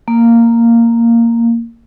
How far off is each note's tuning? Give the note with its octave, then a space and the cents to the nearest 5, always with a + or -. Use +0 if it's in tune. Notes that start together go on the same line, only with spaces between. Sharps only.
A#3 -10